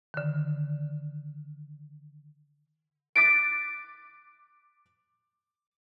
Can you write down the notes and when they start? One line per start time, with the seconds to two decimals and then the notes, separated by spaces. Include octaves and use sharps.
0.14 D3 D#3
3.16 D6 F#6 A6 B6 D7